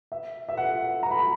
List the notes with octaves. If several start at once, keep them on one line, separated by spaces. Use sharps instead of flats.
E5
E5
F#5
A#5
B5
A#5